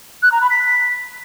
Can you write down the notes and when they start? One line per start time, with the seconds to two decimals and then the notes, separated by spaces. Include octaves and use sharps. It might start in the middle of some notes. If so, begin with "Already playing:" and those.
0.23 F#6
0.32 A#5
0.41 B5
0.50 B6